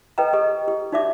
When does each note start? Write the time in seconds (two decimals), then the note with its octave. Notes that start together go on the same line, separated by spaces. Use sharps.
0.18 A4 B4 D#5 G5 A#5
0.33 G4 A4 D#5
0.68 G4
0.92 D#4 F#4 D5 E5 D6